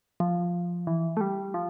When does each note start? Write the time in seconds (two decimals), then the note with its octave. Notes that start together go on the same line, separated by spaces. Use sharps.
0.20 F3
0.87 E3
1.17 A3
1.21 G3
1.54 F3